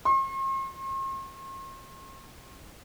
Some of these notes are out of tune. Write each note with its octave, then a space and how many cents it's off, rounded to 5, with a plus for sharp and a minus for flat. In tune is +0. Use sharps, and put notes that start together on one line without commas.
C6 +45